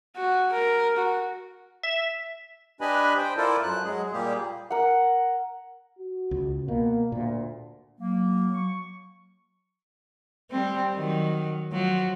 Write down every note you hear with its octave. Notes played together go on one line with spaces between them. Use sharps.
F#4
A#4
F#4
E5
D4 G4 B4 D#5 G#5 B5
C5 G5
E4 F4 A4 A#4 C5 D5
F#2 F#6
F#3 G#3 G#4
A#2 G3 A#3 G4 G#4
A#4 F#5
F#4
C#2
B2 A#3
D2 A#2
F#3 A#3
C#6
G3 C4
D#3 F#3
F3 F#3